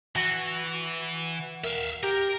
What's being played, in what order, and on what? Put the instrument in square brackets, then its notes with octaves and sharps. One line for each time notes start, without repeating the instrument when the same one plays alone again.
[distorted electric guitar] E3 [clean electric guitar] F#4
[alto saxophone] A#4 [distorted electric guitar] E5 F5
[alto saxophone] G4 [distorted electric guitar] A#4